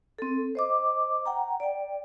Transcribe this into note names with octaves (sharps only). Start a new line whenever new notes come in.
C4 A4
C5 D#5 D6
F#5 G5 A#5
D5 G5